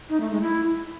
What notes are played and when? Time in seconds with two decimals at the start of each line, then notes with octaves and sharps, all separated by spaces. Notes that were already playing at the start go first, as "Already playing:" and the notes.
0.09 D#4
0.20 A3
0.31 G#3
0.42 E4